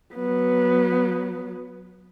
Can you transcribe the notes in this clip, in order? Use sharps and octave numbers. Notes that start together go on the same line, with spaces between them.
F#3 B3